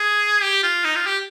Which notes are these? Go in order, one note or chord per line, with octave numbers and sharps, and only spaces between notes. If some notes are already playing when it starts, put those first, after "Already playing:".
Already playing: G#4
G4
F4
D#4
F4
G4